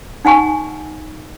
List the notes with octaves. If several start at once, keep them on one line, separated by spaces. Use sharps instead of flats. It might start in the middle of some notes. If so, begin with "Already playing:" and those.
D#4 F#5 G#5 C#6